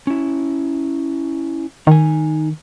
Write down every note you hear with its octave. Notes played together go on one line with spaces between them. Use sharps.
C#4 E4
D#3 D#4 G#5